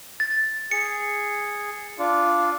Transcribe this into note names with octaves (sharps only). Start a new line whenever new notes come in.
A6
G#4 C#7
D4 F4